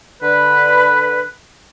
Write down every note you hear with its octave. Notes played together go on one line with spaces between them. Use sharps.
D3 B4